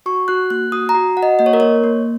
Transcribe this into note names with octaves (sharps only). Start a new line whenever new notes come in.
F#4 C#6
F#4 F#6
A#3 F#6
F#4 D#6
A#5
F#4
F#4 F#5
D#5
A#3 D#5
C#5
A#4
A#3 C#5
A#3